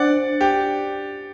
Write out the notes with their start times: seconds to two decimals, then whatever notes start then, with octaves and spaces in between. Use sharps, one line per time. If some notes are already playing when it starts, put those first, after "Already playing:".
Already playing: D4 C5 D5 F#5
0.41 G4